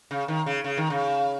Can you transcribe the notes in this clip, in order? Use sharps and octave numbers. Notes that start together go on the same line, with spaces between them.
C#3
D#3
C#3
C#3
D#3
C#3